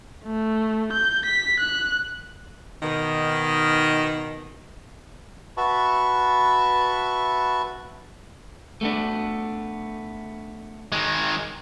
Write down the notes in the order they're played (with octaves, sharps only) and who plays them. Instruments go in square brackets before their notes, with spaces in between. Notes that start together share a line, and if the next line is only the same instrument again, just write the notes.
[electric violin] A3
G6
B6
F#6
[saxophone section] B2 D#3
[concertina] F#4 B4 E5 A5 B5 C#6
[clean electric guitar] A3 B3 D4
[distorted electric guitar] D#3 G#3